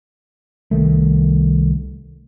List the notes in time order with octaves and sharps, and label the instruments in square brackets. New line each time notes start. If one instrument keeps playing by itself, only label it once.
[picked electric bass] C2 D#3 A3